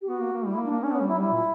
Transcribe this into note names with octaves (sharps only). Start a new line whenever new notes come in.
G4
B3 F#4
A#3
A#3
G3 E4
A#3
D4
A#3
C#4 D4
B3 C#4
G3
E4
F#3
G3 E4
A#2